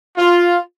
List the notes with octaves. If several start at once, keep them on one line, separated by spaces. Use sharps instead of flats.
F4